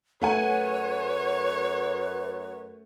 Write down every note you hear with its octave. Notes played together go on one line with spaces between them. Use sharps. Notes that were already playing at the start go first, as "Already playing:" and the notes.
F#2 A3 B4 C#5 F#5 G#5